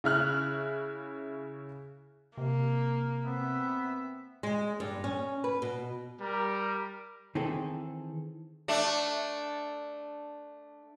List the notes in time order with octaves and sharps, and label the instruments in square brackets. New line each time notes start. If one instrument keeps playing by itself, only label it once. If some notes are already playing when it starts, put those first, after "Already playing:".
[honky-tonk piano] C#3 E4 F6 F#6
[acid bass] C3 [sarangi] A#3
[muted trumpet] B3 [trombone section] C4 [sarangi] E5
[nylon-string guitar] G#3
G2
C#4
B4
B2
[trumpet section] G3 A#4
[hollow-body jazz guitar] D#3 E3 C4 G#4 A4
[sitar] A3 D4